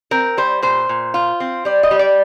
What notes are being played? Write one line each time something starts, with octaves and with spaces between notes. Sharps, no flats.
C4 A#4
G3 C5
A#2 C5
A#2
F4
C4
G3 D5
D#5
G3
D5